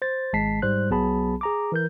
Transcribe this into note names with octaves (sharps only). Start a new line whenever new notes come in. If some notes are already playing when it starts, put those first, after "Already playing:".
C5 A6
G#1 G#3 A5 B6 C7
G#2 G3 C5 F#6
B1 F#3 B3 G#4 A5 B5
G#4 A#5 D6
E3 A#4 G6